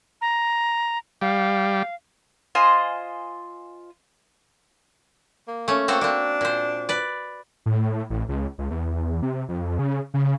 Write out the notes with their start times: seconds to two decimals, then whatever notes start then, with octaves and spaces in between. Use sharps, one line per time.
0.21 A#5
1.21 G3 F5
2.55 F4 C5 D#5 G#5
5.48 A#3
5.68 A3 C#4
5.88 A#3 C4 F#4 A4
6.01 A#3 C4 D4
6.41 A#2 C5
6.89 B4 D5
7.66 A2
8.10 A1
8.29 C#2
8.58 C#2
8.71 E2
9.22 C3
9.49 F2
9.79 C#3
10.14 C#3